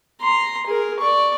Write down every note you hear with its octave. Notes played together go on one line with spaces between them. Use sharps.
A#5 C6
G#4 A#4
D5 C#6